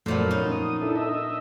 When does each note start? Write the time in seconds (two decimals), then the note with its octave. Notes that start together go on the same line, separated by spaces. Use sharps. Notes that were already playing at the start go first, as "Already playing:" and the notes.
0.06 F#2 A#2 F3 A3 B3
0.31 C#4 D#4
0.52 D#6
0.82 D4 E4 A4
0.96 D#5 E5